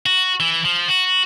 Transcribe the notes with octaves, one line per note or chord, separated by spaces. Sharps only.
F#4
E3
F3
F#4